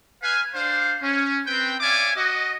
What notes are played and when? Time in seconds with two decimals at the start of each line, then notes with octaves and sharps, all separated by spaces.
0.23 B4 F5 G#5
0.54 D4 C5 F5
1.03 C#4
1.47 C4 B4 G5
1.80 C#5 D5 E5 F5 G#5 D6
2.16 F#4 D#5